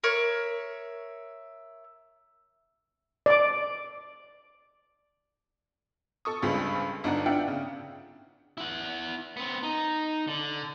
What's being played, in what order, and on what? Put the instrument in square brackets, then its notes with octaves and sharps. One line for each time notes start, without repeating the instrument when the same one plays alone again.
[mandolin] A#4 C#5 E5 C#6
[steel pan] D5 D6
[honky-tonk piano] A4 C#6 D#6
C#2 G2 G3 G#3 C4
G1 D4 D#4 F#5
D4 E4 F4 E5 F#5 G5
C#3
[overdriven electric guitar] E4 F#5
B3 C4
D#4
D3